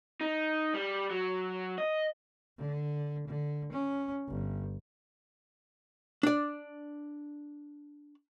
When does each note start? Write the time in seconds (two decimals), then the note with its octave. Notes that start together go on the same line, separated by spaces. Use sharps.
0.21 D#4
0.74 G3
1.11 F#3
1.78 D#5
2.58 D3
3.27 D3
3.72 C#4
4.28 G1
6.23 D4 D5